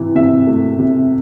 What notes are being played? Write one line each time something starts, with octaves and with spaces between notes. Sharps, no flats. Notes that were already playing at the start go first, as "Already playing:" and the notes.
Already playing: C3 E3
C3 E5
A3
C3